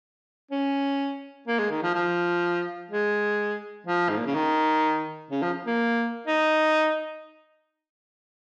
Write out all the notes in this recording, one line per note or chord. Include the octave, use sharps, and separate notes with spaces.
C#4
A#3
G#3
D#3
F3
F3
G#3
F3
G#2
A#2
C#3
D#3
C#3
F3
A#3
D#4